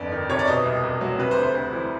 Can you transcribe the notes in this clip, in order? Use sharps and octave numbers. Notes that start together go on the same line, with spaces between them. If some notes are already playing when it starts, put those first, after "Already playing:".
Already playing: G1 F2 D5
D#3
C3 C#5
D5
B2 D#5
C2
C2
F#3
C3 B4
C5
D2
C5
D2 C5
E3